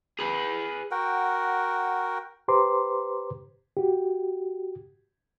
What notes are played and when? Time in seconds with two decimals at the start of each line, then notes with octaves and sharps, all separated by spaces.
0.19 G#4 B4
0.91 F#4 A#4 F#5 G5
2.48 G4 B4 C5 A#5 C6 D6
3.77 F#4 G4